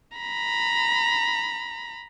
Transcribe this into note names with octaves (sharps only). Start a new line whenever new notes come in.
A#5 B5